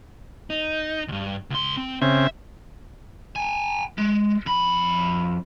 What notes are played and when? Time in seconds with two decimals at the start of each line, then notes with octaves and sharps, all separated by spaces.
0.50 D#4
1.08 D2 G2
1.50 C#2 C6
1.77 C4
2.02 C#3 C4 E5
3.36 G5 G#5
3.98 G#3
4.46 F2 B5